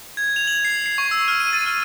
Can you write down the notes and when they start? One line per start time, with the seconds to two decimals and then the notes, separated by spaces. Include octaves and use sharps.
0.17 G#6
0.36 F7
0.47 F#7
0.65 C7
0.86 C7
0.98 C#6
1.11 E6
1.28 F6
1.40 D#7
1.53 A6
1.66 F6